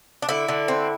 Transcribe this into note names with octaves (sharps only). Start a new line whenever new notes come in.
D4
D3 E4
D3
C4